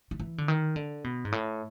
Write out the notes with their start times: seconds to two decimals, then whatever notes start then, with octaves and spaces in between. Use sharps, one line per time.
0.11 D#3
0.20 E3
0.38 D3
0.48 D#3
0.76 D3
1.04 B2
1.25 G#2
1.32 A2